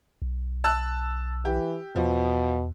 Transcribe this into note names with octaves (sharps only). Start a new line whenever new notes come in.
B1
A5 E6 F#6
E3 G4
E2 B2 F3